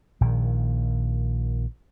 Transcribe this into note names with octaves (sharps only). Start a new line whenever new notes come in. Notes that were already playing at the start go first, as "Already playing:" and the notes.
A#1 A#2 D#3